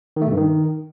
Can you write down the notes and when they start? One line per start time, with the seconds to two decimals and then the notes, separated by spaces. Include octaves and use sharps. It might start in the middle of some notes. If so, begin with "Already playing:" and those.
0.16 D#3
0.22 A3
0.27 B2
0.32 G2
0.37 D#3